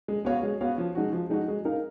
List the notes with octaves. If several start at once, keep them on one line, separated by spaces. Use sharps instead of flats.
G#3
B3 F#4 C#5 F5
G#3
B3 F#4 C#5 F5
F3
G#3 D#4 F#4
F3
G#3 D#4 F#4
G#3
D#4 A#4 F5